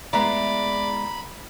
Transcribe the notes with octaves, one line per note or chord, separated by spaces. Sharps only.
G#3 B3 E4 D5 A#5 B5